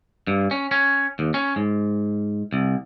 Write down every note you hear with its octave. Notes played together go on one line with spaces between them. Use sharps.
G2
C#4
C#4
D#2
C#4
G#2
C2